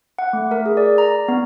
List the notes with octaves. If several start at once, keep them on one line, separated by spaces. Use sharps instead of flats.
F#5
A3
A#4
G#4
D5
A#5
B3